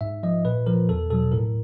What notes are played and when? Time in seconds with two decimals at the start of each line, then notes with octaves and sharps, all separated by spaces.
0.01 G#2 E5
0.23 F3 D#5
0.45 A#2 B4
0.66 F3 A#4
0.89 E2 A4
1.10 B2 F#3 A4
1.32 A2 A#4